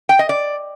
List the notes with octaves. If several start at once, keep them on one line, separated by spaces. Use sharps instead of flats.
G5
D#5
D5